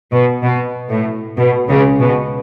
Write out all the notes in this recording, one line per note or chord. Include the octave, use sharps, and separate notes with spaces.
B2
B2
A2
B2
C#2 C#3
B2